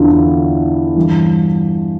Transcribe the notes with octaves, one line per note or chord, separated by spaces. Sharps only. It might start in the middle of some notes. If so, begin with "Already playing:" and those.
Already playing: E2 D3 D4 E4 F4
G2 E3